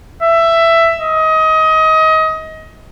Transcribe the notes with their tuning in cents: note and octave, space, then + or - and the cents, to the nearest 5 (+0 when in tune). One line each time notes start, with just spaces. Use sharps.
E5 +15
D#5 +25